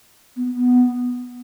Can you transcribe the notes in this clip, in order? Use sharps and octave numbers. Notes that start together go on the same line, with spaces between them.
B3
B3